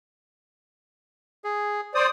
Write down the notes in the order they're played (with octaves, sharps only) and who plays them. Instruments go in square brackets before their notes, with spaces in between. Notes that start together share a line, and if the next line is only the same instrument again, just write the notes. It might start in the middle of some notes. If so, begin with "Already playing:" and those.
[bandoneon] G#4
[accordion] C5 D5 [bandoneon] D#6